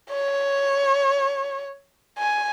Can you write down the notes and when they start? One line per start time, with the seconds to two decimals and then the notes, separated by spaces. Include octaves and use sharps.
0.11 C#5
2.18 G#5